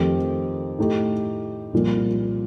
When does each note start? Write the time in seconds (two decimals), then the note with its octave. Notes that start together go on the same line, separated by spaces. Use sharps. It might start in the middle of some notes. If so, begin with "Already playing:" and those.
Already playing: F2 D#3 A3 C4 G4
0.78 A2 A3 D#4 G4
1.73 C2 A#2 F3